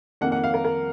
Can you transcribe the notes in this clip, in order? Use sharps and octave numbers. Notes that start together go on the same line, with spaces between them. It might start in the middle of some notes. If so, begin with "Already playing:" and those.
F2 D#3 A#3 F#5
F#5
F5
A#4
A#4